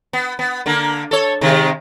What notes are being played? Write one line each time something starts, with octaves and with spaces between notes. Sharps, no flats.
B3
B3
D3 A#3
A4 C#5
C3 D#3 G#3